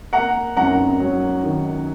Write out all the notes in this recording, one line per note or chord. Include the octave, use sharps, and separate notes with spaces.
A#3 F#5 A#5
F#2 F#5 A#5
F#3
D#3